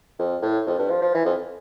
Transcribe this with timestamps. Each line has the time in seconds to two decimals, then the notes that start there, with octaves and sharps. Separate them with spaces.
0.19 F2
0.42 A2
0.67 F2
0.79 G2
0.90 F3
1.02 F3
1.14 E3
1.25 F2